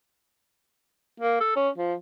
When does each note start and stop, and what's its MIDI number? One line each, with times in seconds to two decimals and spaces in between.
1.20 1.39 58
1.41 1.53 69
1.56 1.69 61
1.78 1.94 53